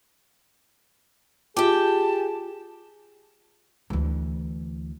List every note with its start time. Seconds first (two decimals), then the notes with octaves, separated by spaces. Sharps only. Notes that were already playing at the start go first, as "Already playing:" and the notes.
1.57 F4 G4 G#4 G5 A5 D6
3.90 D2 E3